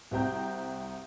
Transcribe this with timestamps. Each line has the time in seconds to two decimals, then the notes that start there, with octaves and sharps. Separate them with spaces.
0.11 C2 C4 F#4 G5 A#5 G6